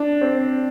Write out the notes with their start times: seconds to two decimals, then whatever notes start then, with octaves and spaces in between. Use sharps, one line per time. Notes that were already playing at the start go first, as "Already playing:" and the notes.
Already playing: D4
0.21 C4